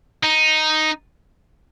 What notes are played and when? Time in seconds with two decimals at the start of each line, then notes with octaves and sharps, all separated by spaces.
0.24 D#4